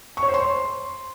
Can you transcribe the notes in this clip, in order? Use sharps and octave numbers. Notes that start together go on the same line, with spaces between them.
C#6
C#5
C5
C6